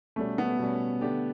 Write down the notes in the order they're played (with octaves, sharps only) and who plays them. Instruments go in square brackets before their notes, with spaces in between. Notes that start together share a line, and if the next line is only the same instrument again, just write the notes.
[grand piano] B2 G3 C#4 [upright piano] A3
[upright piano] B3
[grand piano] B2 G3 C#4
D3 A3 D4 G4